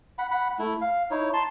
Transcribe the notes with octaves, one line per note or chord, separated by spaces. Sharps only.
F#5 B5
F#5 B5
A3 E4
F5
D#4 E4 C#5
A5 C6